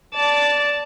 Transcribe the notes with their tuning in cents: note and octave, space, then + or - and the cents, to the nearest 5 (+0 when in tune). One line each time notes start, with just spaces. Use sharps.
D5 -15 A5 +0